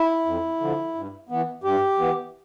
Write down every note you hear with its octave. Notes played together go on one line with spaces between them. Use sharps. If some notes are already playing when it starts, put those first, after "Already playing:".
Already playing: E4
F2
D3 F3
G2
E3 B3
G2 G4
E3 B3